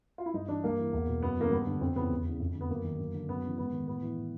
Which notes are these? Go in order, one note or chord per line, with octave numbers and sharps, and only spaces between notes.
F4
E4
G2 D#4
E3 D4
G2 A#3
E3
E2
B2
F#2 B3
C#3 E3 A#3
G2 B3
D3
F2 C4
C#3 E3 B3
E2
C#3 E3
F2
D3
B3
F#2 A#3
D#3
F#2
D3
F#2 B3
C#3 E3
G#2 B3
D#3
A2 B3
E3